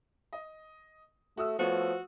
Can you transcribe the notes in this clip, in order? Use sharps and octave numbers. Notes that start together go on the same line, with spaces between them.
D#5
A3 F#4 D#6 E6
F3 A3 B3 F#4 C#5